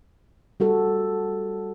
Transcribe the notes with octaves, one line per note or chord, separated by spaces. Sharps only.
G3 F#4 A4